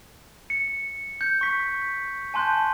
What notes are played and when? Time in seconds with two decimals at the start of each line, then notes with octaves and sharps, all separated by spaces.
0.50 C#7
1.21 G6 C#7
1.41 C#6 B6
2.34 G#5 A5 C6 F#6 G6